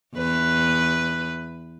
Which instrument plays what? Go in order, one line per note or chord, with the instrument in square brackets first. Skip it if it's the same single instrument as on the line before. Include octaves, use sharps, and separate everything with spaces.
[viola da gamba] E2 B4